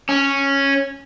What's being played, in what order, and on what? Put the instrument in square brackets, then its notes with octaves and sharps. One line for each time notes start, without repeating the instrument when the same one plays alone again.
[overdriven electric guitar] C#4